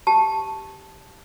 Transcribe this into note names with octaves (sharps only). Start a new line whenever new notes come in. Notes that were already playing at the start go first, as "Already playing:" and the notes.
G4 A5